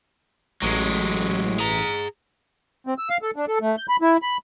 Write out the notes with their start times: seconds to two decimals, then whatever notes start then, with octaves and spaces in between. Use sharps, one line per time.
0.62 A1 F#3 G#3
1.59 G#4 A#5
2.87 C4
2.98 E6
3.10 F5
3.22 A4
3.36 D4
3.48 A4
3.61 A3
3.77 G6
3.89 B5
4.01 E4
4.22 B5